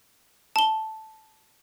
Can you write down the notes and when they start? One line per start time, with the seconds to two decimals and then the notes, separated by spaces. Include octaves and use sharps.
0.56 A5 G7